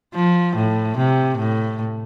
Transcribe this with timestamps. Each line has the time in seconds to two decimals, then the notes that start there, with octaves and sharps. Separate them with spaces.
0.14 F3
0.56 A2
0.97 C3
1.38 A2